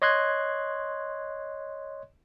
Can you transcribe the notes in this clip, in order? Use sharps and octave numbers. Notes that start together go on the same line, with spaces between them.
C#5 D#5 C6 F#6 G#6